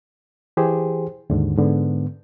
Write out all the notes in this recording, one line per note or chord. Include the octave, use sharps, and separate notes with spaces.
E3 G4 G#4 C5
D#2 G#2 D3
G#2 D3 B3